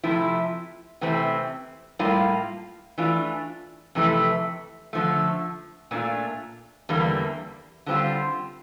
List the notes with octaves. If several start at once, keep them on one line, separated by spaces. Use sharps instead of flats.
C3 F3 A3 E4
C3 E3 A3 C4
A2 G3 A#3 F4
E3 A3 D4 F4
F2 C3 E3 A3
D3 F3 A3
A#2 A3 D4 F4
E2 D3 G3 A#3
D3 G3 C4 F4